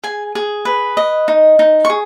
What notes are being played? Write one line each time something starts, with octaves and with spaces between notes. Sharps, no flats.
G#4 G#5
G#4
B4
D#5
D#4
D#4
C#6
G#4